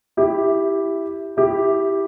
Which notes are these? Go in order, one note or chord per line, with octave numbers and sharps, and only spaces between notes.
E4 G4
E4 G4